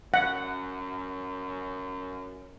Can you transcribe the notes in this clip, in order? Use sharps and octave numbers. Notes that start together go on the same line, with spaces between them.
F#2 F#5